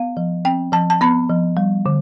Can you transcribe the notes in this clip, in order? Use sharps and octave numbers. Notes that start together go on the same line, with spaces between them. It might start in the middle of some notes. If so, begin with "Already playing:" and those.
Already playing: B3 F5
F3
C4 G5
F3 A5
A5
B3 B5
F3
G3
D3